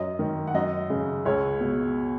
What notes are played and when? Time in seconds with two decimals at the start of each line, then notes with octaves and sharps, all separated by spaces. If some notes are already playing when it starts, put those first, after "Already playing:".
Already playing: F#2 D#5
0.19 D#3
0.47 F#5
0.54 F#2 D#5
0.90 C#3
1.25 C#2 C#5
1.61 B2